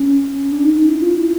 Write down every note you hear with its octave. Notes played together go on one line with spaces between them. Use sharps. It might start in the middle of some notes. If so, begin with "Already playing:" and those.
Already playing: C#4
D4
D#4
D#4
E4
F4
E4